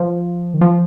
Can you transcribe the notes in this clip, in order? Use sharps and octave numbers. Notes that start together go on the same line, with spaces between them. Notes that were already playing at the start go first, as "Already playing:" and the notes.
Already playing: F3
D#3
F3